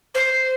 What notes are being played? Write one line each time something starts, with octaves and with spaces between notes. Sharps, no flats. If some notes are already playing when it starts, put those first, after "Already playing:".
C5